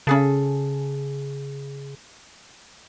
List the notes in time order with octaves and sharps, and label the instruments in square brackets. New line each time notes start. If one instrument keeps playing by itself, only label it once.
[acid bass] C#3 [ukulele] C#4 G#4 A4